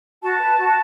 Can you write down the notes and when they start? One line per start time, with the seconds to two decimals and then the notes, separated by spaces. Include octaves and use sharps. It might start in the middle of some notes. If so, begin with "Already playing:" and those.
0.22 F#4 A5
0.39 B4
0.58 F#4